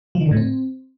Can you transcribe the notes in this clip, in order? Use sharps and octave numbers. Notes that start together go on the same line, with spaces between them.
F3
D#3
D3
A2
C4